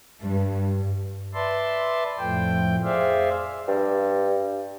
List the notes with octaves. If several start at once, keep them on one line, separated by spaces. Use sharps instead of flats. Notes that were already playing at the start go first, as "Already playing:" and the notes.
G2
B4 D5 E5 A5 C6
F2 A2 F3 A3 G5
G#4 C5 D5 E5 F5
G2